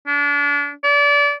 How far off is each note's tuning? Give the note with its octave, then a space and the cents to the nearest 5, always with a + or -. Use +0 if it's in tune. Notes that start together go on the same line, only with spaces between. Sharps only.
D4 -35
D5 -30